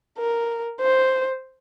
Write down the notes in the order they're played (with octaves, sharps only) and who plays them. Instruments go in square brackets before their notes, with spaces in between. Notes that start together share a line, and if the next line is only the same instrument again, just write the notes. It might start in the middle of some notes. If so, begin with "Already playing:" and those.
[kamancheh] A#4
C5